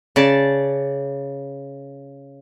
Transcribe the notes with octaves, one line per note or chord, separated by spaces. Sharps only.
C#3 D5 A5